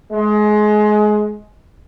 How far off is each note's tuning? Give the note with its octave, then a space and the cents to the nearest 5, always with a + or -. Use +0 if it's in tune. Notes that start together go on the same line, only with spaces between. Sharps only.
G#3 +25